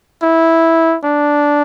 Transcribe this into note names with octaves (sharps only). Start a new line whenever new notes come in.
E4
D4